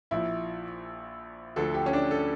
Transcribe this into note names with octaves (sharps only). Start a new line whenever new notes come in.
A#1 A#2 F3 E4
D2 D3 F3 A4
G4
C#4
D4
A4